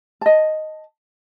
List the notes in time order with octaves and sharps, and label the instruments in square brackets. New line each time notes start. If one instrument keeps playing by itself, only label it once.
[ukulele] D#5 A5